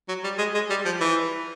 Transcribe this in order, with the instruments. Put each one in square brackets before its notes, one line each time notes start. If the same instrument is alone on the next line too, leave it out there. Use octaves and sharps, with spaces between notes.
[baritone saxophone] F#3
G3
G#3
G#3
G3
F3
E3